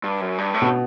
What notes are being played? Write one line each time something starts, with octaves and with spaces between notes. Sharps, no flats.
G2
F#2
G2
A2
B2